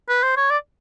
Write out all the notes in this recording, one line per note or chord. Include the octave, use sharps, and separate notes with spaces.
B4
C5
C#5
D5